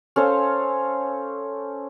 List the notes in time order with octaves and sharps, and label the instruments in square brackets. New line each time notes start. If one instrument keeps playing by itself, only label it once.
[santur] C#4 A4 C5 F5